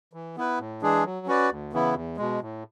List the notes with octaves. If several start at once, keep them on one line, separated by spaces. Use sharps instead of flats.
E3
B3 E4 B4
A2
E3 G#3 D4 G#4
F#3
C#4 F#4 B4 D5
D2
C#3 E3 B3 E4
E2
B2 G#3
A2